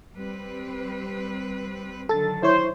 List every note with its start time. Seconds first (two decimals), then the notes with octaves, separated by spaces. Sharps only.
0.15 G3 C4 B4
2.09 D3 D#3 F#3 A4 A6
2.43 E4 C5 C#5